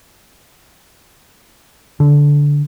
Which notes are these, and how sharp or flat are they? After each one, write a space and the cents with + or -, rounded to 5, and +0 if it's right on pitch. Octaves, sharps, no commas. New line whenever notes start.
D3 -15